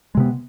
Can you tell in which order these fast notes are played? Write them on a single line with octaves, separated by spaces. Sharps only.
G#3 C3 B3